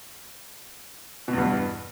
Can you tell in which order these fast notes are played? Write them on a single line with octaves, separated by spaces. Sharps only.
B2 E2 G2